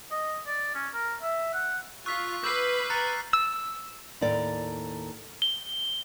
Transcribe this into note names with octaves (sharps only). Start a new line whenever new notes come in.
D#5
D5
C#4
A#4
E5
F#5
F4 C#6 E6 F#6 B6
B4 D6 E6 F6 G6 C7
A#5 F#6 A6 C#7
E6
D#2 A2 A4 D5 G5 A#5
G7